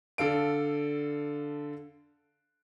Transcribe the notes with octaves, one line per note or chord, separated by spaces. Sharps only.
D3 A4 F5 D7